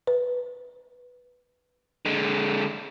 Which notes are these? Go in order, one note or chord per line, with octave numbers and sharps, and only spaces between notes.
B4
D3 G#3